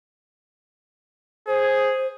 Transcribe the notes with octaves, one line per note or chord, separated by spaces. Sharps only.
G#4 C5